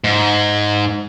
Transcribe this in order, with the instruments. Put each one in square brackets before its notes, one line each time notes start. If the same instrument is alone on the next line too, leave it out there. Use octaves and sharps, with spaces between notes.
[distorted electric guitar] G#2